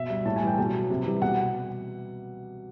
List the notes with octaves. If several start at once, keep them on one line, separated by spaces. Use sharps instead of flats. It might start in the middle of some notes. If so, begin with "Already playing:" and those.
Already playing: B2 E5
G3
A2 A5
G#5
E3 G3 G5
B2
F#3
C3
E3 G3
B2 F#5